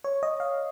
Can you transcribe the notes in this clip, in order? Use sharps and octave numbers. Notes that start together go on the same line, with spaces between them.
C#5
D#5
F5